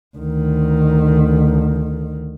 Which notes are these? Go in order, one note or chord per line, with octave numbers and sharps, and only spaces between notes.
D2 D#3